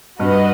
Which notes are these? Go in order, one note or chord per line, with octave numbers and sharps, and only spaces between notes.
G2 F#4 B4 D#5